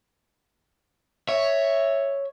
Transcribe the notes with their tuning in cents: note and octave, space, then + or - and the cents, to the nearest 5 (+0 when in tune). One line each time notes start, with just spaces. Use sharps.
C#5 +0 E5 +0